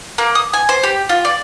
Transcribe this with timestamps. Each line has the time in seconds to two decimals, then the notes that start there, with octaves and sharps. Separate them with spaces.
0.18 A#3
0.35 D#6
0.53 G#5
0.69 C5
0.83 G4
1.09 F4
1.25 D5